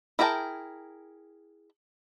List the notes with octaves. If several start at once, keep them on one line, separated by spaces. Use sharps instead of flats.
E4 G#4 A#4 G5 A5